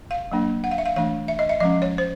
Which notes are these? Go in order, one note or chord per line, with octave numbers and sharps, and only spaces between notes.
F5
F#3 A#3 D4
F#5
F5
E5
F5
E3 A3 D4 F5
E5
D#5
E5
F3 G#3 C#4 D#5
C#5
C5